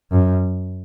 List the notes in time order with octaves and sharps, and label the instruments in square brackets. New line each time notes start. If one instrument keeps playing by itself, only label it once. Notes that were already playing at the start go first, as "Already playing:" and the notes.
[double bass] F#2